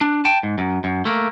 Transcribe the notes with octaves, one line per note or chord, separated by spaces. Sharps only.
D4
G5 A5
G#2
F#2
F#2
A3 A#3